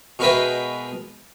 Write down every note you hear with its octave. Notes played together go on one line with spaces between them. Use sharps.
B2 G#3 A#4 B4 E5 G5